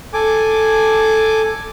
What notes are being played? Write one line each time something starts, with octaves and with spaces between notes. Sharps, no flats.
A4 G#5 D6